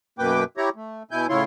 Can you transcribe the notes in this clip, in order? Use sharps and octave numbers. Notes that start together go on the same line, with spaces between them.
F#2 B2 A#3 B4 G5 D6
E4 G4 C#5 A#5
A3
B2 E4 G#5 G6
A2 C#3 E4 F4 C#5 C6